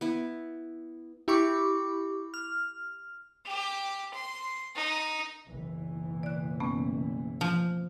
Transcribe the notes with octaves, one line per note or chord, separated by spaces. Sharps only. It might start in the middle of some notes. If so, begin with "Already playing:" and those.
B3 E4
E4 G4 B5 C#6 D6
F6
G4
C6
D#4
F#1 B1 E3
D5 F#6
A3 B3 C#4
F3